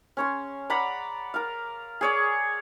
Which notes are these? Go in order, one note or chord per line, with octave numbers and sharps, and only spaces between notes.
C#4 C#5 C6
D5 F#5 A#5 B5
A#4 F5
G#4 C#5 D5